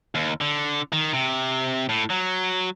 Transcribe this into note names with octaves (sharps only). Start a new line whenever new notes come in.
D#2
D3
D#3
C3
A2
F#3